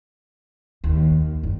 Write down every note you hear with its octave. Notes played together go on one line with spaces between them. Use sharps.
D#2
G2